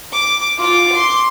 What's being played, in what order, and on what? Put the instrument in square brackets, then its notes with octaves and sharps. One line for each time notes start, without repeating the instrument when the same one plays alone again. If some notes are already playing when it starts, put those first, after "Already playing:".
[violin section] D6
[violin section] F4 [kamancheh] D6
[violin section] C6